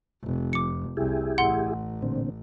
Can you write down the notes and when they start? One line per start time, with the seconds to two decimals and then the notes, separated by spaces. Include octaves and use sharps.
0.23 F1
0.53 F2 D6 C#7
0.97 C2 E4 G4 G#4
1.38 A1 F#5 C6
2.02 A#2 D3 C4